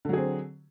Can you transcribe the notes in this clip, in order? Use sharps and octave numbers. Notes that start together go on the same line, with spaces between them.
D3 F#3 C4 G#4